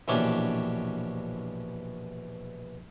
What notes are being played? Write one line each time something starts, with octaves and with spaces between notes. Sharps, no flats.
A#1 B2 E3 C#4 D4 G4